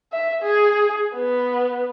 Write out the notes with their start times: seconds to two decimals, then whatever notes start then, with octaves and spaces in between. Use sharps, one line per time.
0.12 E5
0.43 G#4
1.15 B3